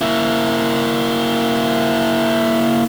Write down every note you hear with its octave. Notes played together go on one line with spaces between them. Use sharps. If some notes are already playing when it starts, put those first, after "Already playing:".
A#3 E4